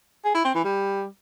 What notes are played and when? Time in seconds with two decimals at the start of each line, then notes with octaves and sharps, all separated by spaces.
0.24 G#4
0.34 E4
0.44 C4
0.54 E3
0.64 G3